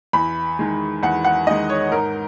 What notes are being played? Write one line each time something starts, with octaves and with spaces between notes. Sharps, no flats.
E2 B5
D#3 G#3
E2 F#5
F#5
D#3 G#3 D#5
C#5
G#2 A#4